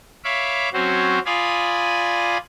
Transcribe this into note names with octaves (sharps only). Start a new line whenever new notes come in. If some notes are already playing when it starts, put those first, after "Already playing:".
C#5 E5 F5 B5 D6
F#3 C4 C#4 F#4 C5
F4 D5 F5 G#5 B5 D#6